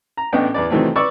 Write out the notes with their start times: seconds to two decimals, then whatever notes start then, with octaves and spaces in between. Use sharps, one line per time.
0.17 A#5
0.33 A1 A2 B3 D4 D#5 G5
0.54 E2 B4 D5
0.70 C3 D#3 E3 F#3 A3 C4
0.96 B4 D5 C#6 E6